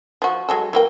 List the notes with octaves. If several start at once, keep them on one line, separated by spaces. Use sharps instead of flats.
F3 F#4
F#3 G#3 A4
E3 A#3 G5